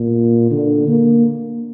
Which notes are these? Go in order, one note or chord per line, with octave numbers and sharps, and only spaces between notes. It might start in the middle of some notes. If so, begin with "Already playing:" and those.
Already playing: A#2
D3
A#3